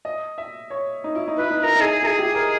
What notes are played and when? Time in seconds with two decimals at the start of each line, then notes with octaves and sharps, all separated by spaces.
0.05 D#5
0.38 E5
0.70 C#5
1.04 D#4
1.15 E4
1.28 D#4
1.36 E4 B4
1.51 D#4
1.59 B4
1.63 E4 A#4
1.75 D#4
1.80 G#4
2.02 E4 A#4
2.06 G#4
2.19 G4
2.35 A#4